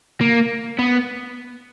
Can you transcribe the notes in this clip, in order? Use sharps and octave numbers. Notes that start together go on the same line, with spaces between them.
A#3
B3